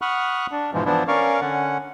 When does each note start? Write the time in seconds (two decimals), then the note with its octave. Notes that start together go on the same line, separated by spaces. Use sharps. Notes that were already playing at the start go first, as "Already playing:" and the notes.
0.02 F#5 B5 C#6 D#6 F6 F#6
0.51 D4
0.73 G#2 B2 E3 F3 G#3
0.85 E3 F3 B3 D4 E4
1.08 C#4 A#4 D5 F5 C#6
1.41 D3 C#4 F#5